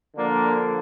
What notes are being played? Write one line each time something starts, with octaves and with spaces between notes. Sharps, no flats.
D3 F3 A#3 D4